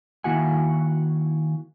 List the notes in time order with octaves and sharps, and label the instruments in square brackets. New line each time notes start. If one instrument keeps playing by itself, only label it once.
[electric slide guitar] D#3 A#3 E4 F#4 F#5 G#5